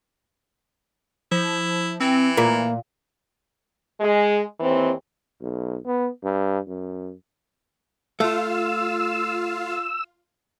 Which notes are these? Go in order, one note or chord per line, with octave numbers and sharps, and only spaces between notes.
F3 E4
E3 C4
A#2 A#3
G#3 G#4
D#2 E3 C4
B1
B3
G2
F#2
A3 F4 F5 E6